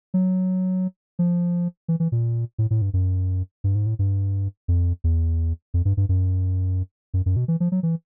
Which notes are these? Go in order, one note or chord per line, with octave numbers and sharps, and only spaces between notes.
F#3
F3
E3
E3
A#2
A2
A2
G2
F#2
G2
G#2
A2
G2
F2
E2
F2
G2
G2
F#2
F#2
F#2
B2
E3
F3
F#3
E3